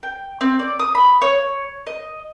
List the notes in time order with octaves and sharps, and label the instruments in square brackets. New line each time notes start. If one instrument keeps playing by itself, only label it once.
[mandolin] G5
C4
D5
D#6
B5
C#5
D#5